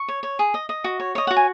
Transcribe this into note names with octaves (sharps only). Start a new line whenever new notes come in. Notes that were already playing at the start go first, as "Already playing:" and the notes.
Already playing: C#6
C#5
C#5
G#4
D#5
D#5
F#4
C#5
C#5 D#5
F#4 F#5
G#5